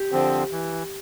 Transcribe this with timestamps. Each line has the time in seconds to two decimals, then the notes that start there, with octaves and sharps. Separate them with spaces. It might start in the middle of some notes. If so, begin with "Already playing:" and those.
Already playing: G4
0.12 D3 F3 C4
0.51 E3